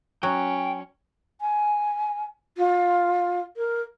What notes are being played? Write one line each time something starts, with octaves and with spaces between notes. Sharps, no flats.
F#3 C#4 G5
G#5
F4
A#4